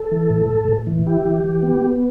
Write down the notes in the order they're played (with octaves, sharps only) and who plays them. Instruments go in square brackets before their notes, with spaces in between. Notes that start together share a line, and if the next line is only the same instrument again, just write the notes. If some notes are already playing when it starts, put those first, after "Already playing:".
Already playing: [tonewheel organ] A4
E3
A2
A2
A2
E3
E4 G4
E3
E3
B3
B3